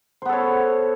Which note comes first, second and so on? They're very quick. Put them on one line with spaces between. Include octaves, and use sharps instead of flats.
C5 B3 A4 C#5